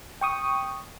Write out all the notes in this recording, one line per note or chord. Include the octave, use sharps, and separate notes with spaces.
G5 C#6 D#6